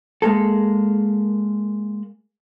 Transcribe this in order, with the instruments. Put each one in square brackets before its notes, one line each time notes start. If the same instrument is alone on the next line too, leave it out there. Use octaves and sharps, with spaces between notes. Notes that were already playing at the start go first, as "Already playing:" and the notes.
[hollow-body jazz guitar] G#3 A#3 A4